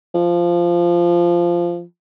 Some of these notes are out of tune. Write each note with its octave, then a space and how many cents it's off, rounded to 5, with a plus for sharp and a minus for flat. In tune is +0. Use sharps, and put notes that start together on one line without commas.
F3 -10